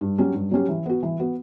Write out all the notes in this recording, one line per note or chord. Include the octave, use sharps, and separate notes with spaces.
G2
F#3 C#4 G4
G2
F#3 C#4 G4
E3
B3 F#4
E3
B3 F#4